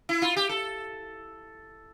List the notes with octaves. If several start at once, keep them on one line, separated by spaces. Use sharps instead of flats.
E4
F4
G4
A4